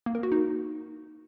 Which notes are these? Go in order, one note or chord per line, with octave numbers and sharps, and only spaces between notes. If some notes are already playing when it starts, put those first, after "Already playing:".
A#3
A#4
F#4
D#4